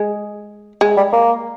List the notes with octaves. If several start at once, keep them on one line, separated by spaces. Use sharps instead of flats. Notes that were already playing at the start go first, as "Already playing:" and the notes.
Already playing: G#3
G#3
G3
A#3